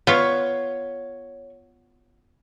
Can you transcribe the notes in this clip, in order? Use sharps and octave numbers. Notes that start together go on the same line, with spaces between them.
B3 F4 C#5